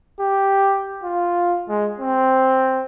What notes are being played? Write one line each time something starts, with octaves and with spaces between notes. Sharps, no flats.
G4
F4
G#3
C4